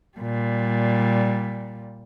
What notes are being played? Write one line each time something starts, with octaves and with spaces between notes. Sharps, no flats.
A#2 G3